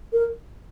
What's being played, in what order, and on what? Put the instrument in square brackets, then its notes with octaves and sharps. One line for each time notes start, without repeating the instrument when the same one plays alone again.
[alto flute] A#4